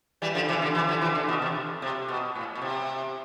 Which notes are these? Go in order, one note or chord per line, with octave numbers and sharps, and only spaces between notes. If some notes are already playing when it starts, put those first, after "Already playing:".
E3 G3
D3 F3
C3 E3
D3 F3
C3 E3
D3 F3
C3 E3
D3
B2
C3
C3
B2
A2
B2
C3